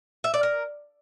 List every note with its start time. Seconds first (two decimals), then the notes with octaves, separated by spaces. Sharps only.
0.24 E5
0.34 D5
0.43 A#4